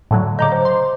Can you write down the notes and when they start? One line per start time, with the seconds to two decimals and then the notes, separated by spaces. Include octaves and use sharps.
0.11 A2 D3 F#3
0.39 C#3 D#5 A#5 D6 G6
0.52 C5
0.65 C6